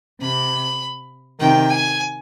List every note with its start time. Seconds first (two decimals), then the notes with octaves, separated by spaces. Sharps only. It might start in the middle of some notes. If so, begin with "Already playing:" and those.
0.20 C3 B5
1.40 C3 D#3 G5
1.70 G#5